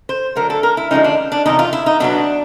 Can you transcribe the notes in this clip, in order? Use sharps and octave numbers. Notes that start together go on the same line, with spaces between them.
C5
D3 F#3 A3 A#4
A4
A#4
E4
D3 F3 G#3 C#4 D#4
D4
D4
E2 C3 D#3 D#4
F4
E4
D#4
B2 F#3 B3 D4